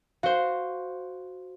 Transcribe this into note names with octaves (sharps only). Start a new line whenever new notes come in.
F#4 C5 F5